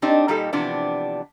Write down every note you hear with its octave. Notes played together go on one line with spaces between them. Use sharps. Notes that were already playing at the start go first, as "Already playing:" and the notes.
C4 D4 D#4 G4
A#2 G3 A#3 D#4 G4 A4
C3 E3 F3 B3 D4